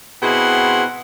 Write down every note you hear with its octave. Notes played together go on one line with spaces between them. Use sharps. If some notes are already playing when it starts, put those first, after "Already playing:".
B2 C4 E4 G#4 F#5 C6